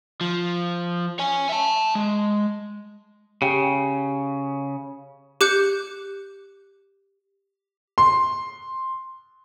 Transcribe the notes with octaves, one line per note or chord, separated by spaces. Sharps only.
F3
C#5 G#5
E5 A5
G#3
C#3 G4 G5
G4 D6 F#6 G6 C#7
C6